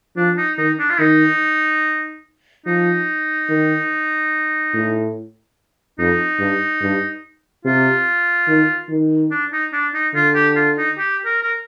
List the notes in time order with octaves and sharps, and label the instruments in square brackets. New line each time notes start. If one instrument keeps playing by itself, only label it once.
[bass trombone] F3 [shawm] D4
[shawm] D#4
[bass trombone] D#3 [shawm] D#4
[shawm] D4
F4
[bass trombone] D#3 [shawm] D#4
[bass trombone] F3 [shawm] D#4
[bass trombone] D#3
A2
[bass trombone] F2 [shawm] D#4
[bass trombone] G2
G2
[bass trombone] C3 [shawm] F4
[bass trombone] D#3
D#3
[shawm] D4
D#4
D4
D#4
[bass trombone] D3 [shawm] F4
[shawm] G4
F4
D#4
G4
A#4
A#4